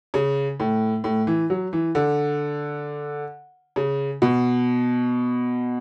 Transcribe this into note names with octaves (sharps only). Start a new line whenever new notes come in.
C#3
A2
A2
E3
F#3
E3
D3
C#3
B2